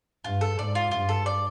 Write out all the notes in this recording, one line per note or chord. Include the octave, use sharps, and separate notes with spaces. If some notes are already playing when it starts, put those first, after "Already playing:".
G2 F4
A4
G#2 D5
F4
G2 F4
A4
D5